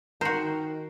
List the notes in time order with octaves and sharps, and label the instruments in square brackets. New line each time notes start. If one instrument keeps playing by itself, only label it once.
[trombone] D#3 [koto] F#4 C5 [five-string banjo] A#4